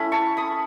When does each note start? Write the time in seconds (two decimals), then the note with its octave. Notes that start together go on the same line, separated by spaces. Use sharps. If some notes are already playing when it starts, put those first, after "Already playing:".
Already playing: A3 C#4 E4 B5
0.12 A5 C#6
0.37 B5 D#6